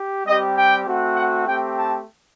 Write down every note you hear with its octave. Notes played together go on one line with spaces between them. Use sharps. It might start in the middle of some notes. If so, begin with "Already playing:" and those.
Already playing: G4
G3 C4 G4 D#5
G5
A3 C4 F#4
F#5
A3 C4 G4 G5
A5